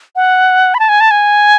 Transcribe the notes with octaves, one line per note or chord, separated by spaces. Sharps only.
F#5
B5
A5
G#5
A5
G#5